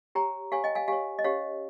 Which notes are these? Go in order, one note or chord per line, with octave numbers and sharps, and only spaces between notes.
G4 C#5 G5 A#5
G4 C#5 F5 G#5
D#5 G5
F5 G#5
G4 C#5 F5 G#5
D#5
C#4 G4 C#5 F5